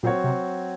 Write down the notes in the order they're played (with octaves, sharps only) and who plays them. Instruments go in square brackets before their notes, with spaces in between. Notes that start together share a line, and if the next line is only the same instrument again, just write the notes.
[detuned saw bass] A#2 [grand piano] F#3 C4 F#4 C#5
[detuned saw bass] C3